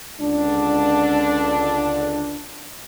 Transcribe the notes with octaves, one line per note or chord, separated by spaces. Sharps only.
C#2 D3 D4